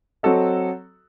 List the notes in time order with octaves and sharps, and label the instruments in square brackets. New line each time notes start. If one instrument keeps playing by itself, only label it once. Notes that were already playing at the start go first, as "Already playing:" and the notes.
[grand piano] F#3 C4 F#4 A4 D#5